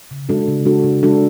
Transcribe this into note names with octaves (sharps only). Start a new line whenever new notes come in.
C#3
G#3 D4 F#4 A4
C#3
G#3 D4 F#4 A4
C#3
G#3 D4 F#4 A4